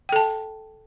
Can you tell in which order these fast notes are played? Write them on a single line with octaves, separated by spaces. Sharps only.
G5 A4 A5